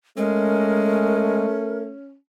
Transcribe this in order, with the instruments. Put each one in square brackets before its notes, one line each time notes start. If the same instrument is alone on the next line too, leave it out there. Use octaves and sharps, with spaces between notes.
[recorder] G#3 [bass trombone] A3 [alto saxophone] C#4 [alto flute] A#4